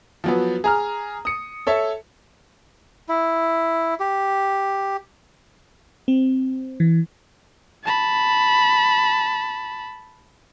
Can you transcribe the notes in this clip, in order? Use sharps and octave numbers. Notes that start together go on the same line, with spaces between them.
F3 F#3 B3
G#4 A#5 F6
D#6 C#7
A4 C#5 E5
E4
G4
C4
E3
A5 B5